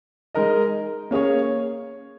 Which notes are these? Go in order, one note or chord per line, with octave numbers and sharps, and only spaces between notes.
G#3 D#4 A#4 D#5
A#3 C#4 G#4 C#5